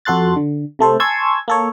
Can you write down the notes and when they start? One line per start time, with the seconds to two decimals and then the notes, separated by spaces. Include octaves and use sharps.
0.05 F2 F#4 A4 C6 F#6 A6
0.36 D3
0.79 C3 A3 A4 C5
1.00 G#5 A5 C6 C#6 E6 G#6
1.48 A#3 A4 C#5